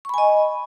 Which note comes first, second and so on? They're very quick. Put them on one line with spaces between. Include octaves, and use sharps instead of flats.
C#6 B5 G#5 D#5